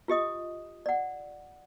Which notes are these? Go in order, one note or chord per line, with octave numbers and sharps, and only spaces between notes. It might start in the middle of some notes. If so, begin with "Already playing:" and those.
F4 G4 D#5 D#6
D5 F#5